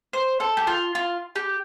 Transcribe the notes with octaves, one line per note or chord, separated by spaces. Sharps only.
C5
A4
G4
F4
F4
G4